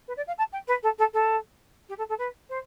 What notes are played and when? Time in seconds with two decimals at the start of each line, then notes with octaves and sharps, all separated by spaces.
0.08 B4
0.17 D5
0.27 F5
0.38 A5
0.52 G5
0.67 B4
0.83 A4
0.98 A4
1.13 A4
1.89 G4
1.98 A4
2.09 A4
2.18 B4
2.49 C5